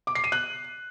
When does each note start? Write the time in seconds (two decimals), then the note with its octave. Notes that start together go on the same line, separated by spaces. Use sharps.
0.07 D6
0.15 C7
0.24 D#7
0.32 F#6